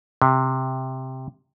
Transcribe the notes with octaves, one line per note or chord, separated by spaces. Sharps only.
C3